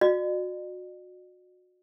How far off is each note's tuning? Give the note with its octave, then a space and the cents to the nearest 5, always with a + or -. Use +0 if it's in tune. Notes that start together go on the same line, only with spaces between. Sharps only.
F#4 -25 D5 +45